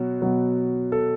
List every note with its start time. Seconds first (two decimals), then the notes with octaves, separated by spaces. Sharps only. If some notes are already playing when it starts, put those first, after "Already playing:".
Already playing: B2 F#3
0.22 B2 F#3
0.92 A4